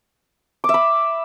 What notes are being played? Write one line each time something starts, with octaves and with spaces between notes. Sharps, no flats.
D6
E5
B5